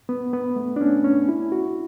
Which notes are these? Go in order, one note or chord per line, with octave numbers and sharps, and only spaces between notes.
B3
B3
A3
D4
C#4
C#4
E4
F#4